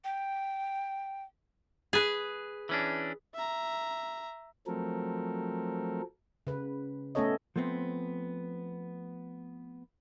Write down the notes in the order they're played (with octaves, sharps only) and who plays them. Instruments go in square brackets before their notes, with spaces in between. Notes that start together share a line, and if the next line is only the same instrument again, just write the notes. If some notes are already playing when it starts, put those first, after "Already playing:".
[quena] G5
[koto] G#4 B4
[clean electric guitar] E3 C#4 D4
[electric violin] E5 A#5
[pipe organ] F3 F#3 A3 C4 A4 A#4
[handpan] C#3 B4
A3 B3 C#4 A4 C#5 D#5
[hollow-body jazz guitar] F3 A3 B3 C4